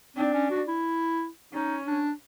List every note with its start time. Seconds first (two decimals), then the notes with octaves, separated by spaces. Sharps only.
0.17 C4 D4
0.34 C#4
0.50 F#4
0.68 E4
1.53 C#4 D#4
1.87 D4